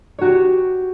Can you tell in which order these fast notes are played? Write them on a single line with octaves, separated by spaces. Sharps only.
C#5 F#4 G4